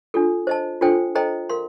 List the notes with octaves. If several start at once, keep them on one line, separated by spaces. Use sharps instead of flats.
D4 F4 A4
C5 D#5 A5
D4 F4 A4 C5 G5
A4 C5 D#5 G5 A#5
A#4 F5 C6